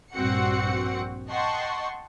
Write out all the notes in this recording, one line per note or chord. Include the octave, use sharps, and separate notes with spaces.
A#1 G2 C4 F#4 F#5 C#7
D#5 F#5 G5 A5 C6 C#6